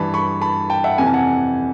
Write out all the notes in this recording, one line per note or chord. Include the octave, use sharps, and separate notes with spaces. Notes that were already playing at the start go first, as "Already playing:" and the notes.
Already playing: G2 E3 A5 B5
B5 C#6
A5 B5
G5 A5
E5 F#5
F2 C3 E3 G#5
A5
F#5 G#5